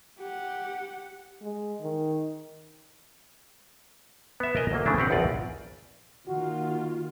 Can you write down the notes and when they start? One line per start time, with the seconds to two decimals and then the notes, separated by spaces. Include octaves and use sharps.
0.19 G4 F#5
1.42 G#3
1.81 D#3
4.40 B3 E5
4.56 A#4 C5 D#5 G#5
4.72 D2 F#3 A#3
4.85 C#3 A3 D4 E4
4.97 B3 C4 G4 F#5
5.10 A#1 E2 F4 D5 D#5
6.28 D#3 A#3 F4 F#4